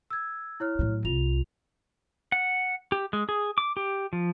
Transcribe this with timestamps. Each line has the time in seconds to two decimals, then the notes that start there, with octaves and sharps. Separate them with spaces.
0.10 E6 G#6
0.60 E4 C#5 F6
0.79 A2 F#3
1.05 C2 F4 F7
2.32 F#5
2.92 G4
3.13 G#3
3.29 G#4
3.58 D6
3.77 G4
4.13 F3